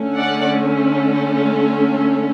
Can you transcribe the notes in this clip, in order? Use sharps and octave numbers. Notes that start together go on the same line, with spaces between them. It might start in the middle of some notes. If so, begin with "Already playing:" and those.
Already playing: D3 A3 C#4
D5 F#5